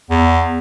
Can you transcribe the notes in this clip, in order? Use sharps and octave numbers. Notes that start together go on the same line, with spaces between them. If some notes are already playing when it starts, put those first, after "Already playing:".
E2